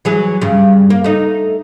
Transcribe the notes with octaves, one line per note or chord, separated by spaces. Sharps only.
E3 F#3 G#4
G2 C#3
A#3
A3 D#4